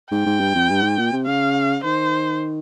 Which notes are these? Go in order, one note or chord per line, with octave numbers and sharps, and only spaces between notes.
G#2 G5
G#2
G2
F2
G2
G#2
A#2
C3
C#3 F5
D#3 C5